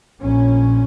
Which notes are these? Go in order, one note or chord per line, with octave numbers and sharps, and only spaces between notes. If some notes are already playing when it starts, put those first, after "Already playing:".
A#1 A#2 C#4